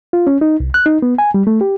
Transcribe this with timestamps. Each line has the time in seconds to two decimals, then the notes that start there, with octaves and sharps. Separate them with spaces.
0.13 F4
0.27 C#4
0.41 D#4
0.60 C2
0.74 F#6
0.86 D#4
1.02 B3
1.18 G#5
1.34 G3
1.47 A3
1.61 G4